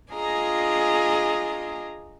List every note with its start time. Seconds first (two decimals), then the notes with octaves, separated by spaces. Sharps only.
0.11 D4 F4 G#4 D#5 G#5 A#5